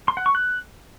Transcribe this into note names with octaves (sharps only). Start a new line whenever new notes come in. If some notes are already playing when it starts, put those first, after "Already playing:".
C6
F#5
C#6
F#6